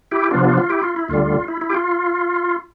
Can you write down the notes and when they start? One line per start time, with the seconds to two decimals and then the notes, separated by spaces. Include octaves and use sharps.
0.11 E4 G4
0.31 C3 F3 B3 D4 F4
0.44 F4
0.58 F4
0.70 E4 G4
0.83 F4
0.96 E4
1.08 D2 D3 G3 F4
1.48 E4
1.61 E4
1.70 G4
1.74 F4